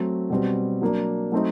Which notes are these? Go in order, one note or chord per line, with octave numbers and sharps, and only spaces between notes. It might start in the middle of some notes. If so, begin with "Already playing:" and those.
Already playing: F#3 A3 C4
B2 G3 C4
F#3 A#3 D4
F#3 A3 C4 D#4